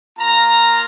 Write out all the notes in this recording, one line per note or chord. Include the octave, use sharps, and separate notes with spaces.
A#3 F4 A#5